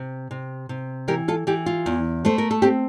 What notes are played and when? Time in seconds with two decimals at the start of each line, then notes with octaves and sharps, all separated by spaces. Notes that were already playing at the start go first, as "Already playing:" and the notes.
Already playing: C3
0.31 C3
0.69 C3
1.08 E3 G4 A#4
1.28 F4 A4
1.47 E3 G4
1.66 F4
1.86 E2
2.25 A3 C5
2.38 A#4
2.51 A4
2.62 C4 G4